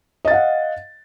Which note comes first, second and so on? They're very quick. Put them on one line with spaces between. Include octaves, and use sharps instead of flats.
D#5 A6 F5 F#5